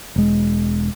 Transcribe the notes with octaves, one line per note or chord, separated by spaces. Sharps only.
E1 G#3